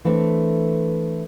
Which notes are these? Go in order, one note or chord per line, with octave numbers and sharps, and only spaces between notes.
E3 A3 C4 D4